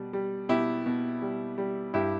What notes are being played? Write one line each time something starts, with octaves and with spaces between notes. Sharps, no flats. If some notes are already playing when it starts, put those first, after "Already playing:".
Already playing: B2 G3
G3
B2 E4 G4
B2
G3
G3
G2 E4 G4